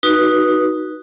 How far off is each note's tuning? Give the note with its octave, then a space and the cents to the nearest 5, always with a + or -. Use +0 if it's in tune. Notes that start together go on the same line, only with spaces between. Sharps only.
D#4 +0 F#4 +0 B4 -25